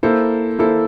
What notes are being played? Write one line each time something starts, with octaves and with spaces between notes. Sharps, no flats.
A#3 E4 A4 C5
A#3 E4 A4 C5